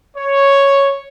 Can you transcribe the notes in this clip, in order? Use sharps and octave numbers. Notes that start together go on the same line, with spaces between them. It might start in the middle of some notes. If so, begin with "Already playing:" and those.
C#5